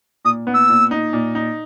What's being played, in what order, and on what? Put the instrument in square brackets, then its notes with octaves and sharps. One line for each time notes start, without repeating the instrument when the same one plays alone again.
[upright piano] A#2 [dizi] D#6
[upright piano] B3
[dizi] E6
[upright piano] A#2
D#4
A#2
D#4